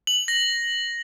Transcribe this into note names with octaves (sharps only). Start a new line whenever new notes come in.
F#7
A#6